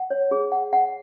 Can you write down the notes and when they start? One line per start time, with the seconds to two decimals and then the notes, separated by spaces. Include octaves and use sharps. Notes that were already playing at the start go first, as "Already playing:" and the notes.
Already playing: F#5
0.10 C#5
0.31 G#4
0.52 F#5
0.73 F#5